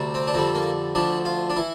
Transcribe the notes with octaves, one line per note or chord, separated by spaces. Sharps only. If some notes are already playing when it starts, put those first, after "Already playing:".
Already playing: D2 C3 G3
C4
D4
F2 D3 G3 C4
A#3
D2 D3 F3 D4
F4
D4
E3 E4